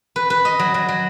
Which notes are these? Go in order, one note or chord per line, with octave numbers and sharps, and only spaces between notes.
B4
B4
D#5
F#3
F#3
F#3